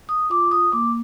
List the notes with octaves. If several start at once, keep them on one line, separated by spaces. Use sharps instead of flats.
D#6
F4 D6
D#6
A#3 D6